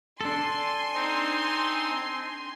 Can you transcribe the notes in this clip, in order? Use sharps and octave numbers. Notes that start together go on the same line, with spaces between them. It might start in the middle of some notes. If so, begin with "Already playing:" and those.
D4 A4 G#5 C6
C4 D#4